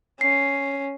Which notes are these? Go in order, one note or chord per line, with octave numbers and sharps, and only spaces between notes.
C#4 C7